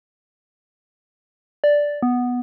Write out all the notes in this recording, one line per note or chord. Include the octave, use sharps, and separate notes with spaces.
D5
B3